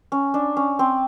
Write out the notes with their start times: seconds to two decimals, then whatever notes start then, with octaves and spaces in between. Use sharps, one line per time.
0.12 C#4
0.34 D4
0.57 C#4
0.79 C4